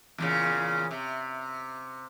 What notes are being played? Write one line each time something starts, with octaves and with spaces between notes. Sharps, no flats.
E2 A#2 C#3
C3